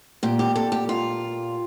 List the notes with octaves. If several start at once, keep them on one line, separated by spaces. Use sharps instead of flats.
A#2 G4
G4
A4
G4
F4